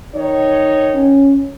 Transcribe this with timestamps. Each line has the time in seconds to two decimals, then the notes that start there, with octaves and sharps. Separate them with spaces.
0.15 D#3 D#4 C#5
0.94 C#4